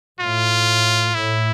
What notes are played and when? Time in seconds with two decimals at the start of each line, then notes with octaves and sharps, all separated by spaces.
0.20 A2 F4
1.15 A2 E4